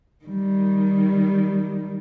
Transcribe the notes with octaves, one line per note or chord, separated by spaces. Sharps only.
D#3 G3